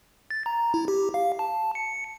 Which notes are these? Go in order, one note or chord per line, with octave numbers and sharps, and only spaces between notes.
A6
A#5
E4
G4
F5
A5
C#7